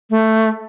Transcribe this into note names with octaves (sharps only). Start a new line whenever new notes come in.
A3